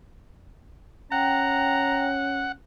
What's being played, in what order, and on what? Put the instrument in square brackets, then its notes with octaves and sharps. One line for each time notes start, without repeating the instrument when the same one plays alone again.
[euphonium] C#4 [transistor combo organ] F#5 [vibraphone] G5 [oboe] A#5